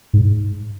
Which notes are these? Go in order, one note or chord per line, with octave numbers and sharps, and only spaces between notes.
G#2